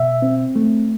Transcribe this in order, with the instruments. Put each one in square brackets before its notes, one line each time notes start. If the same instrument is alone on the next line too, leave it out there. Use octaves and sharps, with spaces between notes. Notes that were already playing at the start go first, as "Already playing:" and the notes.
Already playing: [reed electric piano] B2 E5
C4
A3